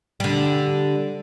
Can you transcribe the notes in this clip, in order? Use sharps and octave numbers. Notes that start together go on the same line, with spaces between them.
D3 G3